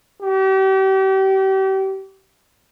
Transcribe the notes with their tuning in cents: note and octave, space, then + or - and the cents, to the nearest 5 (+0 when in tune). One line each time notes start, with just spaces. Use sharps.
G4 -35